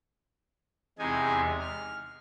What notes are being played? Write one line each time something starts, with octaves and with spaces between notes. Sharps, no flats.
E2 C3 G#3 D#4 G#5
F6